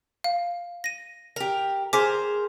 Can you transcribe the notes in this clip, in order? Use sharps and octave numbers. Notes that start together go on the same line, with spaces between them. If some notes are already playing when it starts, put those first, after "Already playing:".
F5
A#6 D#7
G4 A#4
G#4 A#4 C5 D6 B6